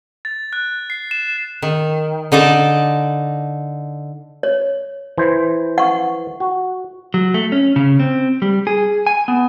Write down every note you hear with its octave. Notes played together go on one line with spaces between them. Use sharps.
A6
F#6
C7
E7
D#3
D3 D#4 D5 A5
C#5
E3 C5
F#5 C#6
F#4
F#3
A3
C#4
C#3
C4
G3
G#4
G#5
B3